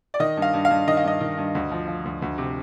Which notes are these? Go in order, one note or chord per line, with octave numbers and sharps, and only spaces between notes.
D5
D#3 D#5
G2
F5
G2
F5
G2
D#3 D#5
F5
G2 D#5
D#3
G2
D2
F3
F3
D2
D2
C3